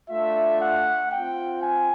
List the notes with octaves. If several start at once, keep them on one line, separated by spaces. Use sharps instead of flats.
A3 D4 F4 E5
F#5
C4 F4 G5
G#5